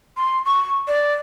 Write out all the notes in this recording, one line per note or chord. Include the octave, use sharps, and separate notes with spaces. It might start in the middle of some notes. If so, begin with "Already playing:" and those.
C6
C#6
D5